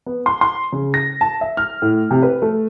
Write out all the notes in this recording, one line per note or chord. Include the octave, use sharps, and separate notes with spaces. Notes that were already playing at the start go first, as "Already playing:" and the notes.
B3
C6
C6
C#3
A#6
A5
E5
F6
A2
C3
B4
A3